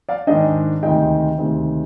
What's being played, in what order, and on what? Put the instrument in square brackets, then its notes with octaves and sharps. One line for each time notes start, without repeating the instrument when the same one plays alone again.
[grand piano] D5 F5
G#2 D#3 G#3 D4 D#5 G5
D2 C3 D#3 G#3 D#5 G5
D2 C3 D#3 G#3